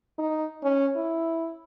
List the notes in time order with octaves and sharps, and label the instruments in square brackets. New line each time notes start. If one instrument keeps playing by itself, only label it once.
[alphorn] D#4
C#4
E4